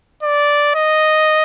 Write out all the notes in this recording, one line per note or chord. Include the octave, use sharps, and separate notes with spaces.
D5
D#5